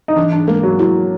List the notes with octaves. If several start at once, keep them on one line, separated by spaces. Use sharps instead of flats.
D#4
E3 D4
D4
G#3 A#3
F#3
F#3 E4